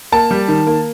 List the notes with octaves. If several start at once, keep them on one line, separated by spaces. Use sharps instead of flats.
A#3 A5
G3
D#3
A#3